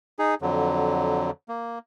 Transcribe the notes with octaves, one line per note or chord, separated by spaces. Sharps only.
D#4 G#4
F2 D3 F#3
A#3